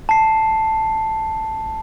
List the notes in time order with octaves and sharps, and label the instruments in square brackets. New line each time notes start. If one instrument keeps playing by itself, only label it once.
[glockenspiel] A5 C7